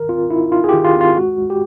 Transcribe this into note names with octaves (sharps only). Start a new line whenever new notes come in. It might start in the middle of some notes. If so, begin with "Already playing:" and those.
Already playing: D#3 A#4
C4 F4
D#4 E4
D#4 F4
G#4
D#3 G4
F4
C4
F4
G#3 F#4
G#3
G4